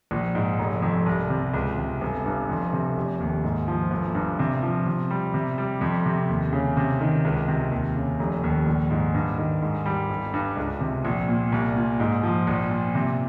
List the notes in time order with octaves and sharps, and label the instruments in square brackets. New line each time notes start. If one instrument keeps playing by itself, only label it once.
[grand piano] A#1
G#2
F1
F2
C2
C3
C#2
C3
G1
G2
F2
C3
F1
D#2
G#2
F3
G1
G2
C3
F3
C3
G3
C3
G3
F2
C3
D#2
C#3
C3
D#3
C#2
C3
D#2
C#3
F1
D#2
A#1
G#2
G2
D#3
G#2
G3
G1
G2
C#2
C3
A#1
A#2
C2
A#2
G#2
F3
A#1
A#2
C3